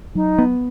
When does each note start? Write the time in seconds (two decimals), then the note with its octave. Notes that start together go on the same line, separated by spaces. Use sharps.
0.15 F#3 D#4
0.39 B3